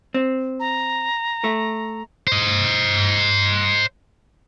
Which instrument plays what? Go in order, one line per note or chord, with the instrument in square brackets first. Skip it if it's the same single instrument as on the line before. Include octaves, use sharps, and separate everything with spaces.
[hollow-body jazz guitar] C4
[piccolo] A#5
[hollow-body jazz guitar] A3
[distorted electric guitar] C5 D#5